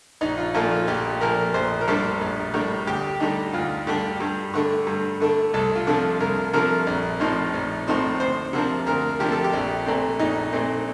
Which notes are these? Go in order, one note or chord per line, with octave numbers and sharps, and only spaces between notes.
A#1 D#4
F4
A#2 F3 A3 F4
F4
A#1 G4
A#2 F3 A3 A#4
A#1 C5
A#4
A2 G3 A#3 D4 A4
A#1
A2 G3 A#3 D4
D2 G4
D3 G3 D4 D#4
D2 F4
D3 G3 D4 G4
G2
D3 A3 D4
G2
D3 A3 D4
C2 A4
F4
C3 F3 A3 D4
C2 A#4
C3 F3 A3 D4 A#4
A#1
A2 F3 C4 D#4
A#1
A2 F3 C4 D#4
D2 C5
C3 F3 A#3 D4
D2 A#4
C3 F3 A#3 D4 G4
A4
G4
A#1
A#2 A3 C4
A#1 D#4
A#2 A3 C4